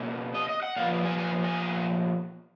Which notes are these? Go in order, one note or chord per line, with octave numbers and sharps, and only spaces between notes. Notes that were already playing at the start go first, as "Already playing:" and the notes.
Already playing: B2 A#3 C#4
D#5
D#5
F#5
A#2 F3 B3 F5
G#5
G#5
G#5